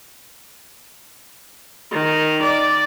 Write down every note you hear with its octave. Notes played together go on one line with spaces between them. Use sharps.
D#3
D5